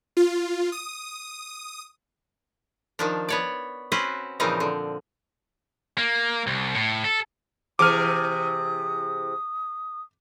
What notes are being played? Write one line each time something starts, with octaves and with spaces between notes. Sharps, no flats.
F4
D#6
D#3 F3 D4
B3 C#5 D5
C4 C#4 F#4 B4 C5
A#2 C#3 E3 F3 C4 D#4
D3
A#3
C2
A2
A4
C3 E3 G#4 D6 D#6 F6